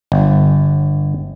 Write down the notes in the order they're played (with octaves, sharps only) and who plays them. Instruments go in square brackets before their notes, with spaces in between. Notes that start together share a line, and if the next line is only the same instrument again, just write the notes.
[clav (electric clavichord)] G1